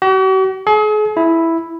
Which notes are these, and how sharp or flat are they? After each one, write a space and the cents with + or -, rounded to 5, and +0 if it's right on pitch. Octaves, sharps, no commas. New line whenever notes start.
F#4 +45
G#4 +40
E4 +0